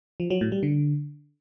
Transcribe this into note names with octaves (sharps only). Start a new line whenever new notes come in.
F3
F#3
A2
G3
D3